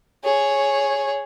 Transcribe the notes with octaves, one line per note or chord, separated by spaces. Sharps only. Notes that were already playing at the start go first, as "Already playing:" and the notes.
G#4 C#5